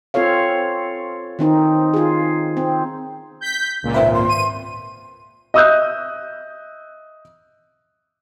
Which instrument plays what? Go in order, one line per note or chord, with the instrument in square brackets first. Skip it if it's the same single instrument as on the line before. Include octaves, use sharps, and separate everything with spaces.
[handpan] C4 F4 A4 C#5 F5
D#3 C4 D#4
F4 G#4
C4
[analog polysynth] G6 B6
C#2 A#2
[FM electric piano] G#1 C4 B4 [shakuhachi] E5
[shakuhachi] C6
[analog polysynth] D#7
[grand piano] D#5 E5 D#6 E6 F#6 G6